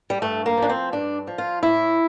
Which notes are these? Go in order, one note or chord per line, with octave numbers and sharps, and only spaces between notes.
G3
G2 A3
A#3
F3 D4
C4
G2 D4
F3
F4
A2 E4